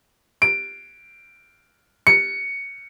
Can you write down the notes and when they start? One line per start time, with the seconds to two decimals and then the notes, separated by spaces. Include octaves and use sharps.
0.42 D7
2.07 C#7